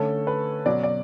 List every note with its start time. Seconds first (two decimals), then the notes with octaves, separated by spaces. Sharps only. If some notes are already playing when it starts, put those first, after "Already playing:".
Already playing: D3 A3 C#4 A4
0.27 B4
0.66 B2 F#3 C#4 D5
0.83 D5